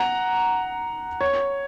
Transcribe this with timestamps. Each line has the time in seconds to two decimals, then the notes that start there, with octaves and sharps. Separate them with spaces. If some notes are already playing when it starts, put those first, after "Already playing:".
Already playing: F#5 A#5
1.21 C#5